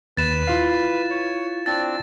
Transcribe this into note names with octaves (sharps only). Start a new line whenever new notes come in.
D#2 B4 A6 E7
E4 F4 F5
C#5
C4 D4 A6